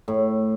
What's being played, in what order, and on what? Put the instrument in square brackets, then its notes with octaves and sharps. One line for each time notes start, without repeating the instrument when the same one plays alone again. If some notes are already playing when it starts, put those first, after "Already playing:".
[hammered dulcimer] A2